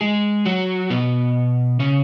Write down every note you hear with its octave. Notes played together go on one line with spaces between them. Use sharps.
G#3 G#4
F#3 F#4
B2 B3
C#3 C#4